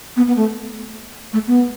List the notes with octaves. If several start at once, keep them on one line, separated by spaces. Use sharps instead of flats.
B3
B3
A3
A3
B3